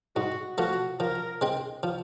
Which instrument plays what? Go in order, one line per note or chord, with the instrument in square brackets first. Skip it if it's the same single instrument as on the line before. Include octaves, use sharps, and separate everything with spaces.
[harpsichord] G#2 [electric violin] F#4
[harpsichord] F3 A3 [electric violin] F#4
[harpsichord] F3 [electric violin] A#4
[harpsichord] G#3 C4
F3